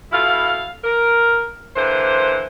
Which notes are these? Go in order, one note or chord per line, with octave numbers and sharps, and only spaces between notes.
B2 E4 A4 F5
A#4
D3 E3 A#3 C5